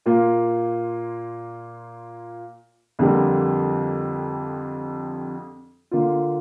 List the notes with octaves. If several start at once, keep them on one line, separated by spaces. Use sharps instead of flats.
A#2 A#3 F4
F2 D3 G3 A#3
D3 A#3 F4